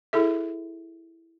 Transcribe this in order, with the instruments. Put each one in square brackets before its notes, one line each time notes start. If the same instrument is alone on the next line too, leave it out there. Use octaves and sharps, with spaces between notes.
[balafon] E4 G#4 A4 E5